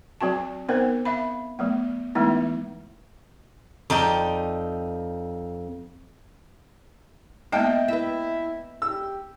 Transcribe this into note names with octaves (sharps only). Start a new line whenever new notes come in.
F#3 C4 F#4 A5
B3 C4 D#4 A#4 C5
E5 F5 B5
F#3 A3 B3
E3 G#3 A3 B3 D#4 E4
F2 D#4 D5 G5
G#3 A#3 B3 D#5 E5 G5 A5
E4 B4 E5
G4 E6